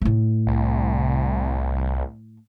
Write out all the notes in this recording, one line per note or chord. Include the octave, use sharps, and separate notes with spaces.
A2 A3
C2